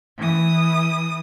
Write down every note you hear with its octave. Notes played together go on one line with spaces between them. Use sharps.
E3 D#6